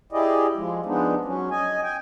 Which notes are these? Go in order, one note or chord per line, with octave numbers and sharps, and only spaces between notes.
E4 G4 G#4 D5 D#5
F3 G#3
F3 G#3 B3 D4 D#4
F#3 C#4
D#5 G#5
G5 G#5